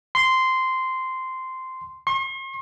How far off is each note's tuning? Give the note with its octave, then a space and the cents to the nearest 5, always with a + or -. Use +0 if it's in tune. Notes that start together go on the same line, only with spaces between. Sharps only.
C6 -10
C6 +45